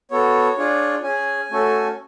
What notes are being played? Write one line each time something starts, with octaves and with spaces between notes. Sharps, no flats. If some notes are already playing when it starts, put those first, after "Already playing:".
B3 F#4 A4 C#5
D4 F4 G#4
C#4 G#4 G#5
A3 C#4 F#4 A4